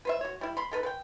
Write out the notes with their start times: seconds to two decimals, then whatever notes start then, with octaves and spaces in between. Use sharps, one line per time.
0.05 B4 C5 E5
0.21 F#4 C#5
0.41 G3 E4
0.57 B5 C6
0.71 D#3 A4 B4
0.83 B4 G5